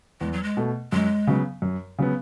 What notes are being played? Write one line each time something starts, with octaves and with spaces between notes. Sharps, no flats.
E2 G#3
F#3
G#3
B2 A3
F#2 G#3
C#3 F#3 B3
F#2
C#3 F#3 B3